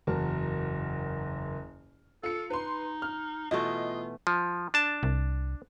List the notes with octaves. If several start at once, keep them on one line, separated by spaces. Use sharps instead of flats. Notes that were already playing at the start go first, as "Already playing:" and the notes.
F#1 E2 F#3 A#4 A5
F4 A4 C#7
D#4 B4 C6
F6
B2 E3 A3 F4 D#5
F3
D4 A5
C2